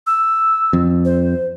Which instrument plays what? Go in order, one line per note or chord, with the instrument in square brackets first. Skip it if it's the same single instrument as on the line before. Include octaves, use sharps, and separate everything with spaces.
[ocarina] E6
[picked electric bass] F2
[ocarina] C5